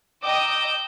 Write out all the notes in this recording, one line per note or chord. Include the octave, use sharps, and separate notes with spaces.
D#5 G5 A#5 D6 E6 G6